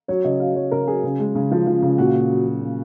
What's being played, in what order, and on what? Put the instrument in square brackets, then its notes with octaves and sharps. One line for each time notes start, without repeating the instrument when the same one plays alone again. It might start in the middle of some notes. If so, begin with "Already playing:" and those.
[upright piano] F#3 C#5
C#3 D#5
F#3 F5
F#3 C#5
C#3 A#4
F#3 G#4
C#3
G#3
C#3
F3
F3
C#3
A#2 F#4
A#2
F#3
F#3
A#2